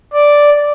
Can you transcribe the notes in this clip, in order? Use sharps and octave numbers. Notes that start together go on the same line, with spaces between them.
D5